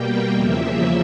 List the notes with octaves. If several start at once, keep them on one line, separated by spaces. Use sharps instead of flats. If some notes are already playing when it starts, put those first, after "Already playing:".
Already playing: B2 G3 A#3 G5
E2 C#3 F3 A#3 E5